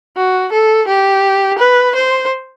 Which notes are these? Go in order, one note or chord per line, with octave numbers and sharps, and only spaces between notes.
F#4
A4
G4
B4
C5